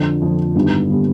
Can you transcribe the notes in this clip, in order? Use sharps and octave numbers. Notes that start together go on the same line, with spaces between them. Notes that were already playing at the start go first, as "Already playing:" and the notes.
Already playing: F2 D3 F3
F2 D3 F3
G#1 G2 D3 G3 B3
D3 G3 B3